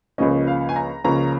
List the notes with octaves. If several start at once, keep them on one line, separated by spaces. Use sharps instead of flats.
C#2 C#3 F3 A#3 C#4 D#5
F5
G#5
A#5
C#2 C#3 F3 A#3 C#4 A#5